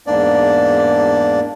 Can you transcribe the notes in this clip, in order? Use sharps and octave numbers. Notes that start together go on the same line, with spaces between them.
E2 G#2 A#3 D4 D5